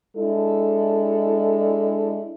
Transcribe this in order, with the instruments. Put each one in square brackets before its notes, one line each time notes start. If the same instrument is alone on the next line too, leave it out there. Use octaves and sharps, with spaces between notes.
[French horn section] G#3 D4 E4 A4